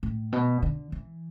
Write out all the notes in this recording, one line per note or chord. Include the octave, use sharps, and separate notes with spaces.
A2
B2
D3
E3